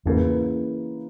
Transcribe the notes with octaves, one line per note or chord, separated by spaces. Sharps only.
E2 G#2 C#3 E3 A#3 E4 B4